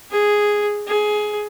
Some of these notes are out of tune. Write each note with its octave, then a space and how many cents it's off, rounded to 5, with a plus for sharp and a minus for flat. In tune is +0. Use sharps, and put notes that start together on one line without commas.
G#4 +0
G#4 +15